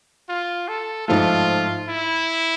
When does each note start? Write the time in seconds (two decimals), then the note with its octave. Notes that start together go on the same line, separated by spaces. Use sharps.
0.29 F4
0.68 A4
1.08 G#2 F3 A3 F4
1.88 E4